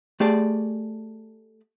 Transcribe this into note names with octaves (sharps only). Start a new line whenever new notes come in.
A3 G4 G#4 D5 A5